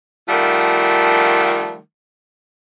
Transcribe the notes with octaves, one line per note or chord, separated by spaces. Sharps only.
D#3 F3 G3 A3 F4 F#5